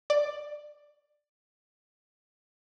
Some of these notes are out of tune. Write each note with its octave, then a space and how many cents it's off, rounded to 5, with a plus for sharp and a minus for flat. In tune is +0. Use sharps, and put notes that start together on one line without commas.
D5 +10